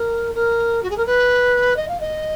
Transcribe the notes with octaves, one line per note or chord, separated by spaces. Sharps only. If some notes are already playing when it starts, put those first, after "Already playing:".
Already playing: A#4
A#4
F#4
G#4
A#4
B4
D#5
F5
D#5